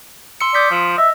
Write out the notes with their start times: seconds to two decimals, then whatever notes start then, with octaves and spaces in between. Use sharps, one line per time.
0.41 C6 E6 C#7
0.55 D5 D#6 G6 B6
0.71 F3
0.98 D#5 E5